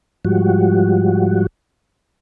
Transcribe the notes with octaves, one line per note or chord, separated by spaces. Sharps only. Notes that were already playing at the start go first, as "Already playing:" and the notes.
G#2 F3 G3 F#4